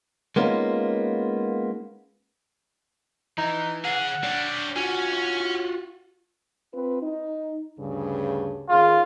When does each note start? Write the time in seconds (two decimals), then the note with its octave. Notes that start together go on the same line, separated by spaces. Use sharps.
0.36 G#3 A#3 B3 C#4 D#4 F4
3.38 E3 D#4
3.85 C#3 G#4 F#5
4.23 G3 D4 C#5
4.76 C#4 F4 F#4 G#5
6.72 C4 F4 B4
7.02 D#4
7.78 D2 G2 C#3
8.69 D#3 C#4 F4 G#4